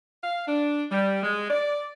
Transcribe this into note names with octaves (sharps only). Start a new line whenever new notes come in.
F5
D4
G3
G#3
D5